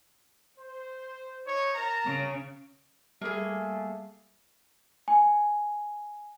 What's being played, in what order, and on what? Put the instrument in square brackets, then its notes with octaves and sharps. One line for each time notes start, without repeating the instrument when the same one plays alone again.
[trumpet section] C5
D#4 C5 C#5
A#4 A5 A#5
[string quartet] C#3
[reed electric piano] G3 [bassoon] A3 [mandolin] A#3 G#4
[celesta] G#5